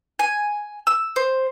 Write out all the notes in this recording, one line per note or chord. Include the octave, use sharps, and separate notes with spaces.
G#5
E6
C5